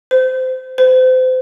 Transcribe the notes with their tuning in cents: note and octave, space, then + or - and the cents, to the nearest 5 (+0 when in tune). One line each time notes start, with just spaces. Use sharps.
C5 -20
C5 -30